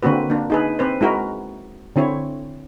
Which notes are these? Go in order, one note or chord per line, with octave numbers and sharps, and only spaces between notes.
D3 A#3 C4 F#4 B4
A#3 D4
D#4 G#4 B4
C4 B4 C5
G#3 E4 F#4 A#4
D3 C4 E4 C#5